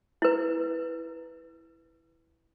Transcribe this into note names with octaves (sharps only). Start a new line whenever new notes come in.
E4 B4